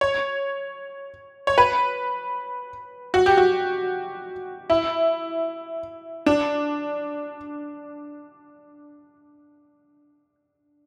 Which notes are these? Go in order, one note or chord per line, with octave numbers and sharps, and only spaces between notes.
C#5
C#5
B4
F#4
G4
F#4
E4
D4